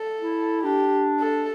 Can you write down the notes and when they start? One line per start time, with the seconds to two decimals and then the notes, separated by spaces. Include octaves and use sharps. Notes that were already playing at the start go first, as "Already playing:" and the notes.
Already playing: A4
0.21 E4
0.63 D4 G4
1.20 A4